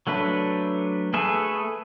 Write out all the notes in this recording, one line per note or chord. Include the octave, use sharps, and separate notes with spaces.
F#3 A3 D4 B4
A3 G#4 A4 B4 E5